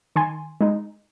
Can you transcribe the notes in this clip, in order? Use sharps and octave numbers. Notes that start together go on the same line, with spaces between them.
D#3 G#5 C6
G#3 D#4